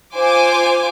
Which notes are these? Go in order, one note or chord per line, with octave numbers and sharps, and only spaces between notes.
F4 C5 G#5 D6